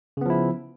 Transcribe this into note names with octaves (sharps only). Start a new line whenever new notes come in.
C#3 F3 B3 E4